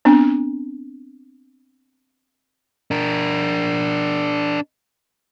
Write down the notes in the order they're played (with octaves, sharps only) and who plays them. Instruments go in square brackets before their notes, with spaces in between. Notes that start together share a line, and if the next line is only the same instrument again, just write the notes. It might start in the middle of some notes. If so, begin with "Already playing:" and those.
[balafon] B3 C4 D4
[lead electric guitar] D4 A#4